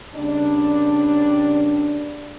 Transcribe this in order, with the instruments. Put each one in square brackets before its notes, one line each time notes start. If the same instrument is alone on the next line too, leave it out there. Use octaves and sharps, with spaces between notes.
[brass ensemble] C#3 G3 A#3 D4